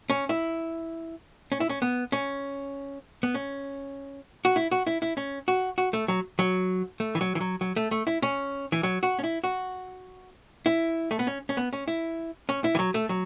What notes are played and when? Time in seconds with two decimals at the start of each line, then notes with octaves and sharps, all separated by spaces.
0.10 C#4
0.29 E4
1.52 C#4
1.60 E4
1.70 C#4
1.82 B3
2.12 C#4
3.23 B3
3.34 C#4
4.45 F#4
4.56 E4
4.71 F#4
4.87 E4
5.02 E4
5.17 C#4
5.48 F#4
5.78 F#4
5.93 A3
6.08 F#3
6.39 F#3
7.00 A3
7.15 E3
7.21 F#3
7.35 E3
7.40 F#3
7.61 F#3
7.76 A3
7.91 A3
8.07 E4
8.22 C#4
8.72 E3
8.83 F#3
9.03 F#4
9.19 C#4
9.24 E4
9.44 F#4
10.66 E4
11.11 A3
11.19 B3
11.27 C#4
11.49 C#4
11.57 B3
11.73 C#4
11.88 E4
12.49 C#4
12.64 E4
12.75 E3
12.79 F#3
12.94 A3
13.09 F#3